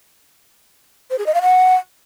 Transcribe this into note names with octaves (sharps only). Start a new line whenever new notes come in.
C5
G#4
D#5
F5
F#5